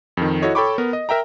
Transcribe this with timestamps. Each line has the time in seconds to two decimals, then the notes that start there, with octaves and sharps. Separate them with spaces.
0.17 F2 D#3
0.42 E4 F#4 A4 C#5 D#5
0.55 A4 C#5 G5 B5 C#6 D6
0.78 B3 A#4
0.93 D#5
1.09 A#4 E5 G5 A#5